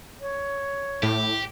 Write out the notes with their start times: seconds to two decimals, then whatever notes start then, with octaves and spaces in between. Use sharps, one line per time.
0.21 C#5
1.03 A2 G4